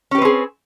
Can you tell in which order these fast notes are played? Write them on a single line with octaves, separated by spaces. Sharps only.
C#4 G4 B4 C4 G#4